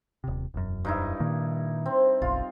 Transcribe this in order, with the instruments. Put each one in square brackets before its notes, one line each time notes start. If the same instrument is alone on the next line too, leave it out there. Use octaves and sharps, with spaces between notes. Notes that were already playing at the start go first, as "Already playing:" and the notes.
[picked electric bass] D#1 C3
E1 F#2
[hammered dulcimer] G2 D#4 E4
[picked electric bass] A#2 D#3 A#3
[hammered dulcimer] C4
[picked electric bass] F#1 B1 [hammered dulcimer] F4